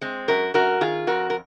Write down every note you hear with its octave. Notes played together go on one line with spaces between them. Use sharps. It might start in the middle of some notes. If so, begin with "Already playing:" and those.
G#3 C4
F#2 F#4 A#4
F#2 F#4 A#4
D#3 F4 G#4
F2 F#4 A#4
A#4